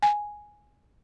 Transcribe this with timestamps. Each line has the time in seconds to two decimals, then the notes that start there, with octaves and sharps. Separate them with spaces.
0.02 G#5